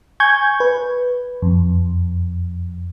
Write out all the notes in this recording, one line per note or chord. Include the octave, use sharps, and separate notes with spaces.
G#5 C#6 G6 G#6
B4
F2